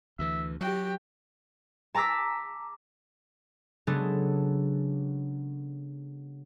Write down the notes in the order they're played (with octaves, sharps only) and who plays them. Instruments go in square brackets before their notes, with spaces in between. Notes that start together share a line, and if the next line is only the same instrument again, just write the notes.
[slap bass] D2 E3 [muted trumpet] E5
[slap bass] F#3 [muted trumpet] F#4 [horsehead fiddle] G4 G5
[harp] A5 A#5 D6 E6 B6
C#3 F#3 G#3 B3 D4 A4